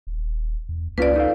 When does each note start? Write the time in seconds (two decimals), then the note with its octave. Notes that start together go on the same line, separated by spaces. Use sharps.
0.07 D#1
0.69 E2
0.98 C#2 A#3 C#4 F4 B4 D5
1.16 D#4 A4 F5